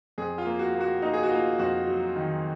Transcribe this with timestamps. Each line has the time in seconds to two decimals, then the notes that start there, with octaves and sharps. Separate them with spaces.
0.18 F2 G#4
0.38 F4
0.46 A#3
0.59 F#4
0.75 A#3
0.81 F#4
1.02 A#3 D#4
1.14 G#4
1.23 F#4
1.31 A#3 F4
1.59 F2 F#4
1.87 F#3
2.16 D#3